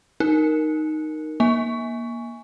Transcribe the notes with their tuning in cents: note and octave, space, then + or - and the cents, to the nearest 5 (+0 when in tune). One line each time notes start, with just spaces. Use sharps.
D#4 -5 A#4 +0
A#3 +20 G#5 +0